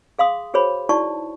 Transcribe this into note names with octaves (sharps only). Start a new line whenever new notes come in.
G#4 F5 C6 D#6
F#4 G#4 C5 C#5 B5
D#4 E4 F#4 D5 A5 C#6